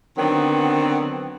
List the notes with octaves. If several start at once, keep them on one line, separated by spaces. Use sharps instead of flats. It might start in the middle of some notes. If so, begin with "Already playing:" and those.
D3 D#3 F#3 B3 C4